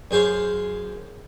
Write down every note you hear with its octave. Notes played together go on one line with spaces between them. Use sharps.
F#2 G#4 C5 F5 C6